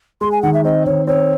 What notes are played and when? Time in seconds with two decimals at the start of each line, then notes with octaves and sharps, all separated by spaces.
0.21 G#3 C6
0.32 G#5
0.42 D#3 F#5
0.54 E5
0.64 C4 D#5
0.86 D#3 C#5
1.07 C4 C#5